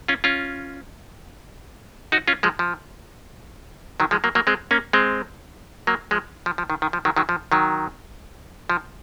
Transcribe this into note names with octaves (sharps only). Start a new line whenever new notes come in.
C#4 F4
C#4 F4
D#4 F#4
C#4 F4
F3 G#3
F3
D#3 F#3
F3 G#3
F#3 A#3
F#3 A#3
G#3 C4
A#3 C#4
G#3 C4
F#3 A#3
F3 G#3
F3
F3
D#3
D#3
F3
D#3 F#3
D#3 F#3
F3
D#3 F#3
F3